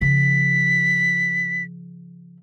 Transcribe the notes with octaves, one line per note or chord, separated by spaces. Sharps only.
C#3 F3 B6